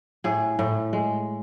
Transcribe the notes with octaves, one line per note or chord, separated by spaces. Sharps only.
A2 G#4
A2
G#3